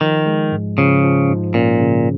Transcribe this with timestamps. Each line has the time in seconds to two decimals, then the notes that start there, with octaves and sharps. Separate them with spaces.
0.01 D#3 F3
0.26 G#3
0.52 G#2
0.78 C#3 F3
1.04 F3
1.29 G#2
1.54 A#2 C#4
1.80 C#3